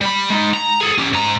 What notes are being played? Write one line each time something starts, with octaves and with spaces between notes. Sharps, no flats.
G3 B5
G#3 D#4
A#5
G#4 A4
C#4 G4
G#2 A#5